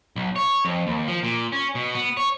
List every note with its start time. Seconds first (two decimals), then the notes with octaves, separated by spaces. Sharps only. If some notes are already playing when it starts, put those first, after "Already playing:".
0.16 B1
0.36 C#5
0.65 F2
0.87 D#2
1.08 F3
1.23 A#2
1.52 C#4
1.75 B2
1.95 B3
2.17 C#5